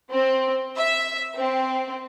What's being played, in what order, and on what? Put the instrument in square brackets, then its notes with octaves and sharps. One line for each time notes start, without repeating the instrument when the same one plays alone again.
[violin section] C4
E5
C4